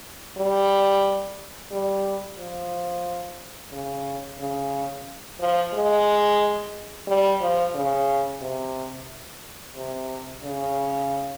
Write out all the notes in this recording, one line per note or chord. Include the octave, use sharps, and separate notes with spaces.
G3
G3
F3
C#3
C#3
F3
G#3
G3
F3
C#3
C3
C3
C#3